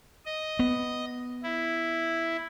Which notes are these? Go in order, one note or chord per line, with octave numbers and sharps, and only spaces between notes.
D#5
B3
E4